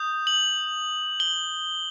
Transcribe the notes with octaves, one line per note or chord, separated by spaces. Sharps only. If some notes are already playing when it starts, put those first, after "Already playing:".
Already playing: D#6 G6
F#7
G7